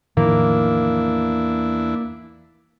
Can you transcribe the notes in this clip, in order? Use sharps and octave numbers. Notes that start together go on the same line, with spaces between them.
E2 A2 D#3 F3 A#3 D4 E4